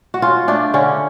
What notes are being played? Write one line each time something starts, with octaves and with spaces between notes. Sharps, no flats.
F#4
C#4 F4
A3 D4
D3 C#4